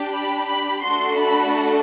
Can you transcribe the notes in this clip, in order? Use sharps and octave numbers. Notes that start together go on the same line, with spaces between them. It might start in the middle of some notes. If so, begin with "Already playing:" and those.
Already playing: D4 G4
B5
B5
A3 D4 F#4 A4 C6
B5